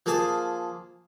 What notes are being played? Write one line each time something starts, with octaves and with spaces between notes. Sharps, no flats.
F3 A#3 G#4 A5